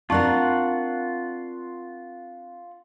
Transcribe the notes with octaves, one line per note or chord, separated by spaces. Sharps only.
C4 D4 F4 A#4 F#5 A5 C#6